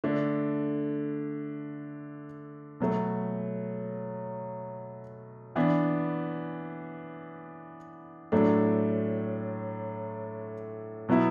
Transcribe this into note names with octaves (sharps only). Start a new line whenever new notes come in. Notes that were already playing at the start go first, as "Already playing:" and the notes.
D3 A3 D4
B2 F#3 A3
E3 B3 D4
A2 F#3 A3 D4
B2 F#3 B3 E4